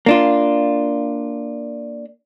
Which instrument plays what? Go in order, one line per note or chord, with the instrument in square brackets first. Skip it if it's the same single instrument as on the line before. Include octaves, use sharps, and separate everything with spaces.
[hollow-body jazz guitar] A#3 D4 F4